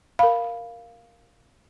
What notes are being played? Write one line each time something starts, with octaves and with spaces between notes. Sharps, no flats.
A#4 F5 B5